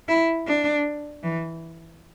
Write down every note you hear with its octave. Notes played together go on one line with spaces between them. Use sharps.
E4
D4
E3